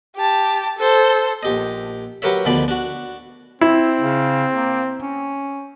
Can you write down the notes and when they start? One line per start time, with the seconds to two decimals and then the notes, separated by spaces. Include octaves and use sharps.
0.16 G4 A5
0.78 A4 C5
1.43 A#1 G4 D#5
2.22 F#3 G4 A#4 B4 C#5 E5
2.45 D2 B2 D#3 F3 D5 B5
2.68 D4 F#4
3.61 C4 E4
4.01 C#3
4.52 A#3
5.01 C#4